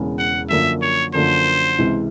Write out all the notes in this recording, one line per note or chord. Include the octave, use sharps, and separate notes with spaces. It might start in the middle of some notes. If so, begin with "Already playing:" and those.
Already playing: E1 E2 C#3
F#5
F#2 D3 F3 A#3 E5
C#5
F#2 D3 F3 A#3 C5
C#2 C3 E3